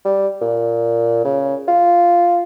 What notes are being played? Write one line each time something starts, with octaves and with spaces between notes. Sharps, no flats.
G3
A#2
C#3
F4